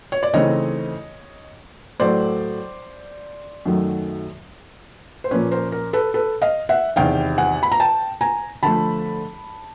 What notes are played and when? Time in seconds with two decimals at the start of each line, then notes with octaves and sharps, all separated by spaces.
0.12 C#5
0.23 D5
0.33 C#3 E3 A3 C4 D#4 C#5 D#5
2.00 A2 F#3 A3 C5 D5
3.66 F#2 D#3 F#3 A3
5.24 C5
5.31 A#2 F3 A#3 C#4 B4 C#5
5.51 A#4 C5
5.72 A#4
5.93 A4 B4
6.14 A4 B4
6.42 D#5 F5
6.69 E5 F#5
6.96 E2 C3 D#3 F5 G5
7.38 F#5 G#5
7.63 B5
7.72 A#5
7.80 G5 A5
8.21 G#5 A#5
8.63 D3 F3 A3 A5 B5